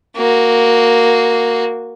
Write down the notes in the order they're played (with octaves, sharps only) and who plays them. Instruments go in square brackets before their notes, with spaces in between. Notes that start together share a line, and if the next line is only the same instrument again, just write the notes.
[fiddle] A#3 F#4